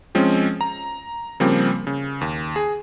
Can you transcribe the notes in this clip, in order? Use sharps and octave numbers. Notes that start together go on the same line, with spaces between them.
F3 G#3 C4 C#4
A#5
C#3 F3 G3 A#3 C4
C#3
D#2
G#4